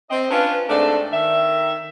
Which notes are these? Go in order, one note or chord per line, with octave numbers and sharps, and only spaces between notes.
C4 D#5
C#4 D4 F4 B4
G#2 A3 C4 D4 A4 D5
D#3 E5